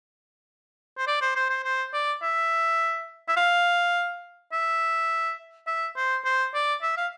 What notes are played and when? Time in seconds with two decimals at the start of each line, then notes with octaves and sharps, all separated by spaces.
0.98 C5
1.07 D5
1.22 C5
1.36 C5
1.50 C5
1.64 C5
1.93 D5
2.23 E5
3.28 E5
3.37 F5
4.53 E5
5.67 E5
5.96 C5
6.25 C5
6.54 D5
6.82 E5
6.97 F5